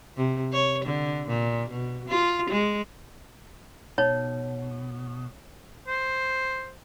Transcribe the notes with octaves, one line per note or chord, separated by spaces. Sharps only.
C3
C#5
D3
A#2
B2
F4
G#3
B2 D#4 C#5
C5